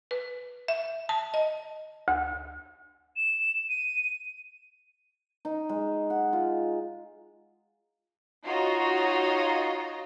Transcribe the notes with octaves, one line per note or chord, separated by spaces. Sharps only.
B4
E5
A5
D#5
D2
E7
D#7
D#4
G#3
F#5
F4
D#4 F4 F#4 C#5 D#5 A#5